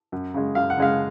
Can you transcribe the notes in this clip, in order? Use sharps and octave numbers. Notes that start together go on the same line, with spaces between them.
F#2
C#3 G#3
F#2 F5
F#5
C#3 G#3 F5